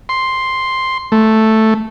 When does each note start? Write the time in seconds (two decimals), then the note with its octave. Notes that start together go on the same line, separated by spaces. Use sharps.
0.09 C6
1.12 A3